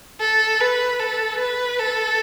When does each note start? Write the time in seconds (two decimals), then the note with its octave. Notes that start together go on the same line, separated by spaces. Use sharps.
0.20 A4
0.61 B4
1.00 A4
1.39 B4
1.79 A4